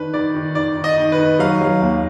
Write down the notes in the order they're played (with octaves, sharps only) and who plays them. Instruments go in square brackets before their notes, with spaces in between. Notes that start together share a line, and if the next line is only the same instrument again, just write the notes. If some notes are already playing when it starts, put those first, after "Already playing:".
Already playing: [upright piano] D#3 D4 [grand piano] B4
[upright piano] D#3 [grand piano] D5
[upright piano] D#3
[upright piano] D#3 [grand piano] D5
[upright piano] D#3
[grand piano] D#5
[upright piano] D#3
[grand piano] B4
[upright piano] D#3
[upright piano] F#3 [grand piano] F5
[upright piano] F#3
D#2